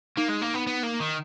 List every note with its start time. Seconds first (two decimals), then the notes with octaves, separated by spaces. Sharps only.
0.18 A#3 D#4
0.29 G#3
0.42 A#3
0.54 B3
0.67 B3
0.83 A#3
1.00 D#3